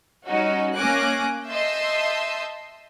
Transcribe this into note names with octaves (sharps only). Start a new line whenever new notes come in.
G3 C#4 D#4 F#4
A#3 C#4 G#5 D6 F#6 A#6
D#5 E5 A5 C6 E6 G6